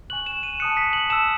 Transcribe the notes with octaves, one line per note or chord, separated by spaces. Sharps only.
G#5 C#6 F#6 F#7
E7
D#7
A5 D#6 F#6 C#7
B6
F#7
A5 E6 E7